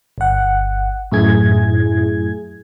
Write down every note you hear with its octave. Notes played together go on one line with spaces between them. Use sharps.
G1 F#5
F#2 A2 E4 G#4 G#6